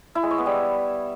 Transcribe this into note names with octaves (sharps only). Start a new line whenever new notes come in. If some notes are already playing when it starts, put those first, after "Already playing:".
E4
G#3
C#5
B3
G3